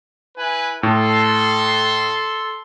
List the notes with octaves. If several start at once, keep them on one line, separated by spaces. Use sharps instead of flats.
E4 B4 G#5
A2 A4 C6